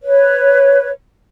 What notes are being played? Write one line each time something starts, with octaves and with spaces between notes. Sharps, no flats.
B4 C#5